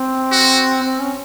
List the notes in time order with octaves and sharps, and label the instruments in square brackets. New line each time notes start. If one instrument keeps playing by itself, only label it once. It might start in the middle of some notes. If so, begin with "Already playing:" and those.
Already playing: [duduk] C4
[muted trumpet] F#4
[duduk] C4
C#4